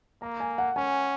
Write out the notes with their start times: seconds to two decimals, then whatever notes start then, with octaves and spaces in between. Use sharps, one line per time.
0.22 A#3 A#5
0.40 G#5
0.58 F#5
0.76 C#4 G#5